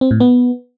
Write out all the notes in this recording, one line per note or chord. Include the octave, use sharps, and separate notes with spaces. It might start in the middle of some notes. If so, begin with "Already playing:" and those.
C4
A2
B3